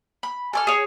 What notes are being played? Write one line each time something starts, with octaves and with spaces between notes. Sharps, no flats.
B5
A4 G#5 C#6 F6
G#4 C#5